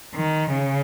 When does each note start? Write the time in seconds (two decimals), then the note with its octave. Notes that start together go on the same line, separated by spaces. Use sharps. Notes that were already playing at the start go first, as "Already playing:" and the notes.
0.14 D#3
0.52 C#3